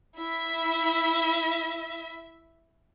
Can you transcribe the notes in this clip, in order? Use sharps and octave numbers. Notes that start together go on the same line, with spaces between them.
E4 E5